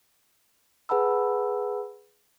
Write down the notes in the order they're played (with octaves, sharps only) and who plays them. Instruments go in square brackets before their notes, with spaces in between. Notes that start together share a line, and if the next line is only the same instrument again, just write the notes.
[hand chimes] G#4 B4 F#5 A5 B5 E6